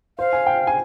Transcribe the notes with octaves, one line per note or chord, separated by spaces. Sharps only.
C5 F5
G#5
G5
G#5